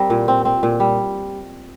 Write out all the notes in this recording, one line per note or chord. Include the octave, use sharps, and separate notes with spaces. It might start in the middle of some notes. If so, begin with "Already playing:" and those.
Already playing: G3 C4 A#4
A#2
C4
C4
A#2
G3